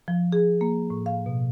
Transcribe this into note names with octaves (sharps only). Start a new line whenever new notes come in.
F3
G#4
A#3
A2
F5
B2